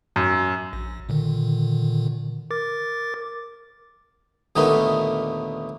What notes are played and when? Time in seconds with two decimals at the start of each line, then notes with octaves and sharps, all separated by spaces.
0.16 F#2
0.73 A#1
1.09 A#2 D3 D#3
2.51 A#4 D6 A6
4.56 D#2 A#2 D3 A3 B3 D#4